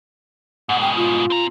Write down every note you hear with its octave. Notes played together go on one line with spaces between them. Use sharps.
G#2 B2 F#5
G5
F4
C4 A#5